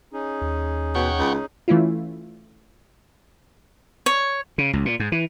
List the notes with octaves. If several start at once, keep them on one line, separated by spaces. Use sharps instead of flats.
C#4 D#4 G#4
D#2
B2 C#5 F#5 G5
C#2
E3 A3 C#4 E4 F4
C#5
C#3
C#2
A#2
G#2
E3